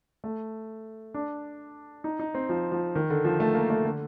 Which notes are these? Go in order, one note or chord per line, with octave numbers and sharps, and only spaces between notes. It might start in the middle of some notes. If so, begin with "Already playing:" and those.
A3
D4
D#4
D#4
C4
F3
F3
D#3
D3
F3
A3
A#3
A3
D3